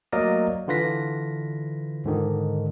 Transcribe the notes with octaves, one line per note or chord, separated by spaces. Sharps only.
F#3 A3 A#3 A#4 D5 D#5
D3 E3 F4 B4 A#6 B6
G#2 D3 D#3